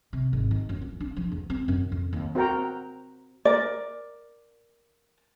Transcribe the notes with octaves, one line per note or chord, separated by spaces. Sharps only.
C3
G#1
D#3
F#2
F2
D4
F3
E2
C4
F#2
F2
D#2
C4 F#4 A#4 G5 A#5
A#4 D5